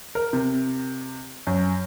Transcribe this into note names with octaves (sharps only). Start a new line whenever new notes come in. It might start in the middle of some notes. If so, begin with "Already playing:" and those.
A#4
C3
F#2